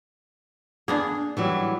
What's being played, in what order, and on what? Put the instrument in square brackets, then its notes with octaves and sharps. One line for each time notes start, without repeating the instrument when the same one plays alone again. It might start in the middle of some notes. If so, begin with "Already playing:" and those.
[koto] A#3 B3 D4 [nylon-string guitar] G#4
[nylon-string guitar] E3 F#3 G3